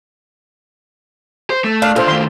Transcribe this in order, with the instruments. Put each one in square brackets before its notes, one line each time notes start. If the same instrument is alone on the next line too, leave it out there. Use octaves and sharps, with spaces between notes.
[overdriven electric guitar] C5
A3
[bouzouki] D4 [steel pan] F5
[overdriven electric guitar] A#2 F5 [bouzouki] F4 [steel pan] A4 C5
[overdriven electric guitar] D#3 A3 [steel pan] C6